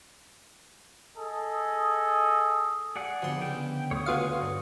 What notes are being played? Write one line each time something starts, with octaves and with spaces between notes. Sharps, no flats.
G#4 A4 D#5
G#4 D5 F#5
D3 F3 B3 G4 C6
C#3 G5
D2 C#5 D#6
D2 B3 F4 G#4 F5
G2